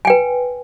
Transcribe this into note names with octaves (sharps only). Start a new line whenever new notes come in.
B4 G5 G#5